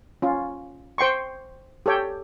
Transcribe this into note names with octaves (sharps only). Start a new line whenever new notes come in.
C#4 F4
C5 G5 C6 C#6
G4 A4 C#5 G5